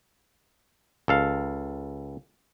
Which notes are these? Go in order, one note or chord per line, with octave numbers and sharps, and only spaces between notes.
C#2 A4 F5